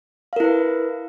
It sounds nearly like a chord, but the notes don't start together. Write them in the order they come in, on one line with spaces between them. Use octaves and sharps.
F5 A#4 E4 B4